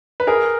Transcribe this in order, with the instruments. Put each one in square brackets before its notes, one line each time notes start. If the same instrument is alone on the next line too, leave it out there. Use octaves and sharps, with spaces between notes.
[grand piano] B4
G#4 A#4